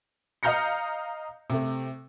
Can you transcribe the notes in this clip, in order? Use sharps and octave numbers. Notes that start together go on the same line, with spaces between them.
D#5 F5 A#5 G6 A#6 C#7
C3 A3